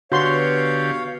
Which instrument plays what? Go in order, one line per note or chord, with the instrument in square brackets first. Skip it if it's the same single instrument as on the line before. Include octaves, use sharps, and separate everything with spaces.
[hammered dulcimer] B2 [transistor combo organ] D3 G4 [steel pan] F#4 C6 [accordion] C#5 F5